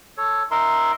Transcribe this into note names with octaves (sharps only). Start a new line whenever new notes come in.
A4 C#5
D#4 A#4 E5 C6